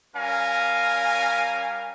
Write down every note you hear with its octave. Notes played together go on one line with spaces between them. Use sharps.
G3 C#4 A#4 F5 G#5